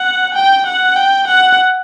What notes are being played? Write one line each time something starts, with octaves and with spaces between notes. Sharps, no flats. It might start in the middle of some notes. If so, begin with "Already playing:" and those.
Already playing: F#5
G5
F#5
G5
F#5